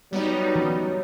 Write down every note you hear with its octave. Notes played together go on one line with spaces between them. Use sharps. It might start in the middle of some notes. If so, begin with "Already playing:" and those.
F#3 G3 B3 D#4
E3 C#4